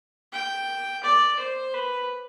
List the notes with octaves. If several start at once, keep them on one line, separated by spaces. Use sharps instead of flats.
G5
D5
C5
B4